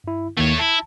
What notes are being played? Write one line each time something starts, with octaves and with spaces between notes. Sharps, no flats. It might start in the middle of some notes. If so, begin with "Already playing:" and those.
G2 E4
D#2 D#3 A3 A#3 C#5
E4 A5